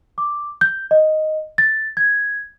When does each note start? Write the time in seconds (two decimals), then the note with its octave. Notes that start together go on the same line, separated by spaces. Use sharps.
0.18 D6
0.61 G6
0.91 D#5
1.58 A6
1.97 G#6